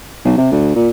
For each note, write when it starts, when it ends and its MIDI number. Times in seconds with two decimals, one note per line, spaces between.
0.25 0.37 35
0.38 0.47 48
0.52 0.70 38
0.75 0.89 46